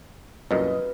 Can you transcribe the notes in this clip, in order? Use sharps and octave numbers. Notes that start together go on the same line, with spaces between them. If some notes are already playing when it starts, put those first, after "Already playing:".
C2 F#2 A#2 B4 D#5